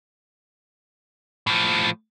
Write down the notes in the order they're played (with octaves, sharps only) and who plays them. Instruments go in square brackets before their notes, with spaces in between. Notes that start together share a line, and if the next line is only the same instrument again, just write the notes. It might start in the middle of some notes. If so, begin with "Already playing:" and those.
[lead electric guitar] A2 F3